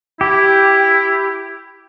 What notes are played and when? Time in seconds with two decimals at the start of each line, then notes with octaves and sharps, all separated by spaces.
0.21 E4 G4